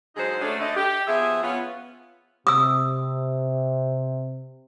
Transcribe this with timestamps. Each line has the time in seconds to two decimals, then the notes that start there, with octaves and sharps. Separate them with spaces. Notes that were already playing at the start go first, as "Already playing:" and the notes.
0.16 D3 F#3 G#3 D#4 G#4 C5
0.41 F#3 A3 C#4 D4
0.59 D3 A3 D#5
0.76 G4
1.08 F3 B3 G#4 E5
1.43 B3 C#4 F4
2.47 C3 D#6 E6